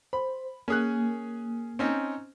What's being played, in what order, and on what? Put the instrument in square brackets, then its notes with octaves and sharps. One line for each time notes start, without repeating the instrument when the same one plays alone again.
[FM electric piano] C5 [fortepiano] B5
[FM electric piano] A#3 [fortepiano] C#4 G#4 F#6
[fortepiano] C4 C#4 D#4